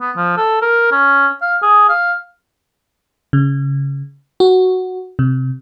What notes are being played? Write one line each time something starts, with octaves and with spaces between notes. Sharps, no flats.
B3
F3
A4
A#4
C#4
F5
G#4
F5
C#3
F#4
C3